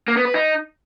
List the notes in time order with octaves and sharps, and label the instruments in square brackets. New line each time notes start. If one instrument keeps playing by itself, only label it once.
[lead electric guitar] A#3
B3
B4
D#4